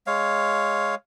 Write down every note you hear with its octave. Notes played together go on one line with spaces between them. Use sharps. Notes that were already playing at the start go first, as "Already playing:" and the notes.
G#3 C#5 F5